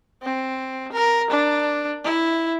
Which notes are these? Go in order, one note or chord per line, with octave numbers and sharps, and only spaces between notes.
C4
A#4
D4
E4